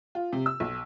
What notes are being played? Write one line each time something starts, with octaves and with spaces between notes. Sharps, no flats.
F4
C3
E6
B1